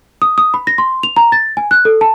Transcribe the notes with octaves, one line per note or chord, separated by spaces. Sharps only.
D#6
D#6
B5
A#6
C6
F7
A#5
A6
G#5
F#6
A4
A5